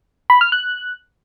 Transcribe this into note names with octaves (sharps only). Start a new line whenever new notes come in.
B5
F6
F#6